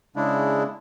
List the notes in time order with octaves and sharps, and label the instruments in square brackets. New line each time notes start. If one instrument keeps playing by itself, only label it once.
[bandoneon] C#3 G#3 D4 E4